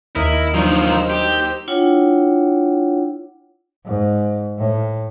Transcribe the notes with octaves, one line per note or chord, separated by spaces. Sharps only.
D#2 E4 A#4 D#5
D#3 F3 F#3 D4 D#4 F#4 C5 E6
G4
D4 E4 F4 C#5 F#5 G5
G#2
A2